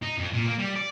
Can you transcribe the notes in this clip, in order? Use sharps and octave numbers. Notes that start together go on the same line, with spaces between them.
D#4
F2
A#2
A#3
G3
D5